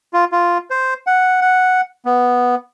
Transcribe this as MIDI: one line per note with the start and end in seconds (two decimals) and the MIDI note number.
0.13 0.25 65
0.32 0.58 65
0.70 0.94 72
1.07 1.41 78
1.41 1.81 78
2.05 2.55 59